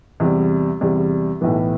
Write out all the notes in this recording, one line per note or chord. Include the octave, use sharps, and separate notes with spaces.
E2 C3 G3
E2 C3 G3
B1 A2 E3 B3